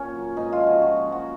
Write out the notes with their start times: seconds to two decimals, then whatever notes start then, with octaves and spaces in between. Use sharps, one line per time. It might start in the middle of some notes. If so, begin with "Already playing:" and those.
Already playing: A#2 C#4
0.15 F#3
0.37 G#2 D#4
0.53 F4
0.60 F3
0.67 F#4
0.82 A#2 F#4
0.97 F#4
1.05 F#3
1.12 F#4